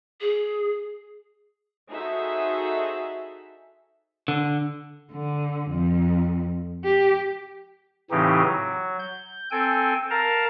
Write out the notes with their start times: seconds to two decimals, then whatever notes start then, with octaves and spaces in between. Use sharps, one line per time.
0.21 G#4
1.89 D#4 F#4 G#4 A4 C5 E5
4.28 D3
5.12 D3
5.71 F2
6.84 G4
8.11 A2 C#3 E3 C4 D#4 G4
8.43 F#3
8.99 G6
9.51 C4 A4 G5 G#5
10.10 A#4 F5 A5 A#5